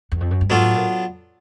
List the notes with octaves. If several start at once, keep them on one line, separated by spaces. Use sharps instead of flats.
E2
F2
F#2
G2
G#2 F#3 B3 D4 F4 A4
A2
A#2